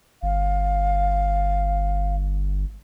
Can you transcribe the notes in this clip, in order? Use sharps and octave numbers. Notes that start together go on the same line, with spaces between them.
G1 F5